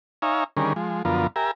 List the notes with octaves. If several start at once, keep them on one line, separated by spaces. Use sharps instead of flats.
D#4 C#5 E5 F5 G#5 A#5
D3 D#3 G3 C#4 G#4 A#4
F3 G#3
F#2 D3 F3 B3 F4 A#4
G4 A#4 E5 G#5 A#5